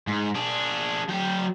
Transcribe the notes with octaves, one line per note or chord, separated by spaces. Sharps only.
G#2
D4 G#4
F#3 G5